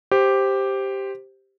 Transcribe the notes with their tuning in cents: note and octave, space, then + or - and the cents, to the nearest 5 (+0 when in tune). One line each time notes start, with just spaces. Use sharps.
G4 +0 C5 +0